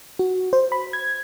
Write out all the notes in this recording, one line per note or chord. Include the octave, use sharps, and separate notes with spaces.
F#4
C5
B5
G#6